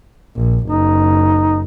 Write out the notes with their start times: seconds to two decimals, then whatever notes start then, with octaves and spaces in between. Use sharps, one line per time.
0.37 A#1
0.68 F#1 D#4